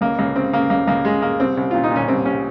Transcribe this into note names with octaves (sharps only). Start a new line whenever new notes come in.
C#2 A#3
C#2 A#3
C#3 C4
C#3 A#3
C#2 A#3
C#2 A#3
C#3 G#3
C#3 A#3
C2 C4
C2
A#2 F4
D#4
A#2 C#4
C2 C4
C2 C#4